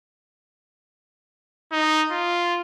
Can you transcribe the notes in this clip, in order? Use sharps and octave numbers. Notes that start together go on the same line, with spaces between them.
D#4
F4